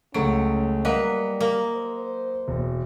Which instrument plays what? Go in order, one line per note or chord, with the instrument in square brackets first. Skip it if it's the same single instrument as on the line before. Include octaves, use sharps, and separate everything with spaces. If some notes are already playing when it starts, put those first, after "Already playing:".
[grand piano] C#2 A3 D7 [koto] F#3 [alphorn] C#4
[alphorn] G3 [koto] A#3 B4 [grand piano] D#5 F#5 A#5
[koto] A#3
[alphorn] C5
[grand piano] E1